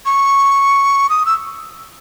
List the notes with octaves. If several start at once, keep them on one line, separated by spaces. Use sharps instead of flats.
C#6
D#6
E6